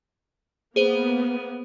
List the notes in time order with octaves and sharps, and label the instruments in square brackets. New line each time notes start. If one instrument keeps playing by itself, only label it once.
[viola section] A#3 B3 [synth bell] G#4 C5 D#7